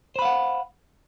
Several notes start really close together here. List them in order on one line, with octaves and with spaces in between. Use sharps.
C5 B5 F5 F#5